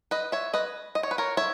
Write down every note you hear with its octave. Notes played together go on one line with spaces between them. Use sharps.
B4 D#5
C#5 E5
B4 D#5
D#5
C#5
B4
A#4 C#5
C#5 E5